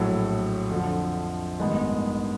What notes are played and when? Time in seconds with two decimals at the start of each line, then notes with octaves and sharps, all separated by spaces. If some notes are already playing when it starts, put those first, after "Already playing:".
Already playing: A#1 A2 F#3
0.70 F2 D3 F3
1.59 A1 G2 D#3 G#3 B3